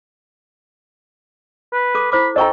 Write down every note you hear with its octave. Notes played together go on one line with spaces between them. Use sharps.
B4
A4 D6
E4 C5 B5 D6
A4 C5 D#5 G5 A#5 C#6